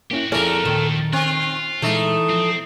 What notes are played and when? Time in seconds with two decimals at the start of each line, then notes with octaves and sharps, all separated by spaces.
0.11 A#3 C#4 E4 F#4 G4
0.32 F2 A3 E4 G#4 A#4 D5 F6
0.65 D#2 A#2 D#3 F3 A4
1.13 C4 F4 F#6
1.82 A#2 E3 G#3 A3 D#4
2.30 F3 C4